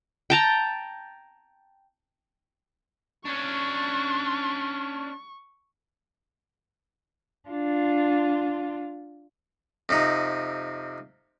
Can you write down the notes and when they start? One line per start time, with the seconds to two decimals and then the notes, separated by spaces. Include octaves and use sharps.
0.30 G5 A5 A#5
3.25 C#4 D4 C#6
7.49 D4 F4
9.89 F2 C3 D#4